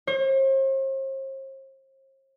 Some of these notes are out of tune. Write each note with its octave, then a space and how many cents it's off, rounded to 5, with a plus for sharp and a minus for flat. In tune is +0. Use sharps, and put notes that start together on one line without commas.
C5 +45